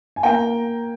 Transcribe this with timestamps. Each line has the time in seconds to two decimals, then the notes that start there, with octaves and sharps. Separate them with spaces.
0.16 G#5
0.23 A#3 G5 A#5